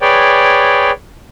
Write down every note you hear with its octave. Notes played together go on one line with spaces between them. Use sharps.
G#4 B4 C#5 D5 G5